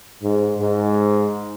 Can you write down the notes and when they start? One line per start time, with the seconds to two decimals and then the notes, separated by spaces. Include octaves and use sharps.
0.23 G#2
0.57 G#2